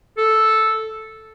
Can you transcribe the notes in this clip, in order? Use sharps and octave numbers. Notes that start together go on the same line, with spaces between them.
A4